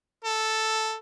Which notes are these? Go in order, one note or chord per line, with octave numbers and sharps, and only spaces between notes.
A4